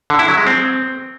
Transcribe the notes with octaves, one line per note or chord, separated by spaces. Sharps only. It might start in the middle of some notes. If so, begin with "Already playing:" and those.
D3
E4
F#3
G#3
C4